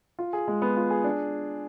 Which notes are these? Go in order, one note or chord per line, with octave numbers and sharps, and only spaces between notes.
F4
G#4
G#3
B3
F4
G#4
D4